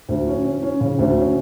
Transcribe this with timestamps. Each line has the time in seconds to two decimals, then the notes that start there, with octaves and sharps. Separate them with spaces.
0.09 D2
0.27 C#4
0.44 C#4
0.63 C#4
0.81 C#3
0.99 D2
1.17 C#4